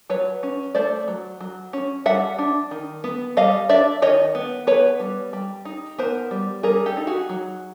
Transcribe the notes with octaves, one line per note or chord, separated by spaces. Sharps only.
F#3 B4 C#5
C#4
A3 C5 D5
F#3
F#3
C#4
G3 E5 F#5
D4
D#3
B3
G3 D#5 F5
D4 D5 E5
D#3 C#5 D#5
B3
B3 B4 C#5
G3
G3
D#4
B3 A#4 C5
G3
G3 G#4 A#4
G4 A4
D#4
F#4 G#4
F#3